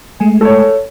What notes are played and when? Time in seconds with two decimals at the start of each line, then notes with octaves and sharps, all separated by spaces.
0.20 G#3 A3 G#5
0.41 A4 C#5